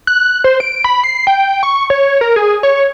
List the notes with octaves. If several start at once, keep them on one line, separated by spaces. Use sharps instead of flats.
F#6
C5
D7
B5
C7
G5
C#6
C#5
A#4
G#4
C#5